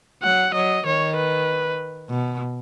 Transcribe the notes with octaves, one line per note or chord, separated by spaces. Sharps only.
F#3 F#5
F#3 D#5
D#3 C#5
B4
B2